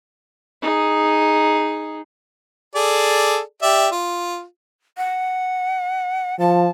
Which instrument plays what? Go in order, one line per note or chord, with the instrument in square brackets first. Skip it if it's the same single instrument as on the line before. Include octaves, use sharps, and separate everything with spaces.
[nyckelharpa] D#4 G#4
[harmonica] G#4 A4 D5
G4 D5 E5
F4
[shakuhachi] F#5
[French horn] F3 [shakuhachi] A5